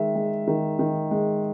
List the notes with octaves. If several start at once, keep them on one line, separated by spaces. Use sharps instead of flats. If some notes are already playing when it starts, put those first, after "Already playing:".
Already playing: D#3 G#3 E5
G#3
D#3
D#3
G#3